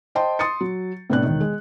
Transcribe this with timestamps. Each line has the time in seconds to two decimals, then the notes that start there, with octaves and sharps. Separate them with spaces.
0.15 C5 D#5 G5 A5 C6
0.39 C6 D#6 A6 C#7
0.61 F#3
1.10 A2 C3 B3 D4 F#6
1.23 E1 D#3
1.41 G#3